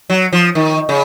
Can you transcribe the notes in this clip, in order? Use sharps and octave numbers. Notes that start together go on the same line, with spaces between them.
F#3
F3
D#3
C#3